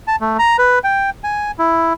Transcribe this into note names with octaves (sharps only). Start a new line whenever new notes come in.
A5
A3
A#5
B4
G5
G#5
E4